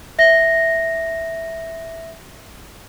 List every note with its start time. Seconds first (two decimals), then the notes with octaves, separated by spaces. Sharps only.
0.19 E5 A#6